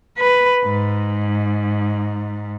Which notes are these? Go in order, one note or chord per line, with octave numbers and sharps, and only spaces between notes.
B4
G#2